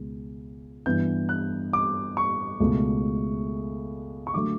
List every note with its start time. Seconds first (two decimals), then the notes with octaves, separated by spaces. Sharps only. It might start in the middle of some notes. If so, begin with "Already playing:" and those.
Already playing: C#2 B2
0.86 G2 E3 B3 G6
1.29 F#6
1.73 D6
2.17 C#6
2.60 C#2 B2 A3
4.27 C#6
4.34 D3 F#3 A3 D6